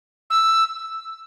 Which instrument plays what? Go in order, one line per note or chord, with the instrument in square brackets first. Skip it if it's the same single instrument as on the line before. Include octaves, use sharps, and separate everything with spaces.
[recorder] E6